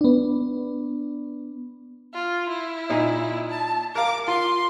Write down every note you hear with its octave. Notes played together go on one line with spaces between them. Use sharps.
B3 D4
F4
E4
A#2 D#4
A5
A#4 F5 D6
F4 C6